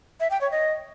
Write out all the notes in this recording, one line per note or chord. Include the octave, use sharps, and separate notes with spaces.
E5
G5
C#5
D#5